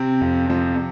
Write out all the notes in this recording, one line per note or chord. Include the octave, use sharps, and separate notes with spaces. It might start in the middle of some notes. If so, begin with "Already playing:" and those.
Already playing: C3 C4
F2
F3 C4